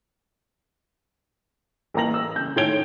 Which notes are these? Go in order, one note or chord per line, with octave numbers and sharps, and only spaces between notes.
A1 A#3 B4 A#5 A#6 F#7
E6
C#3 G6
A2 D#3 C#5 G#6 D7 G7